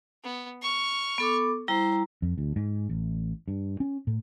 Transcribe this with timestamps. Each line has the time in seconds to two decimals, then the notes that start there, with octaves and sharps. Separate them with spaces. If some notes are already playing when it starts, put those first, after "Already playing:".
0.24 B3
0.62 C#6 F6
1.18 B3 A4 D6
1.68 G3 E4 C5 A#5
2.22 F2
2.38 D2
2.56 G#2
2.89 A1
3.48 G2
3.80 C#4
4.07 A2